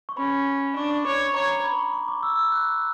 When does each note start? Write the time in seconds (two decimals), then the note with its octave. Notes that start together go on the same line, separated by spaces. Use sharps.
0.09 C#6
0.17 C#4 B5
0.76 D4 C#6
0.91 D6
1.05 C#5 D6
1.20 C#6
1.35 C#5 A#5
1.64 B5
1.79 C#6
1.93 C#6
2.08 D6
2.23 E6
2.52 F#6